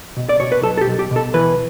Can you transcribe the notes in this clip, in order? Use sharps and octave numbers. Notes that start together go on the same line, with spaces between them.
B2
D5
B2 C#5
B4
B1 A4
A4
G4
B1
G4
B2 A4
E3 B4